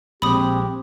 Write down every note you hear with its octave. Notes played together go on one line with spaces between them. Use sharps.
A#1 G#3 C4 G4 B5 D#6